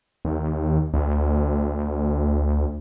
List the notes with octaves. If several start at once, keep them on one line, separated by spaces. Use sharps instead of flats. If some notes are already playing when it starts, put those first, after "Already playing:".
D#2
D2